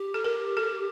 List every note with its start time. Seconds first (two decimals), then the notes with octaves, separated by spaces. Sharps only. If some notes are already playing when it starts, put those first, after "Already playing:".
Already playing: G4
0.14 A4
0.24 A#4
0.57 A4